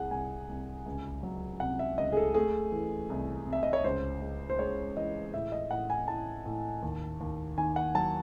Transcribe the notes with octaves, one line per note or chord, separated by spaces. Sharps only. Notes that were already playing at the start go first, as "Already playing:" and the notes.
Already playing: C2 G#4 F#5
C2 G#5
C2
C#2
F#3
C3 F#5
E5
C#2 D#5
G#4
A4
A3 G#4
E3
C2
C3
E5
D#5
C#5
C#2 C5
G#3
C5
G#3 C#5
E3 D#5
A2 E5
D#5
A2 F#5
G#5
A2 A5
A2
D#2
D#2
D#3 G#5
F#5
F#3 A5